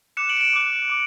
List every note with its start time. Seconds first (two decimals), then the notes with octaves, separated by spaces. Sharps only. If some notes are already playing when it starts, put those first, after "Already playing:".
0.17 D6 F#6 C#7 E7
0.29 D7 F#7
0.37 E7
0.41 D7 F#7
0.53 D6 F#6
0.90 D6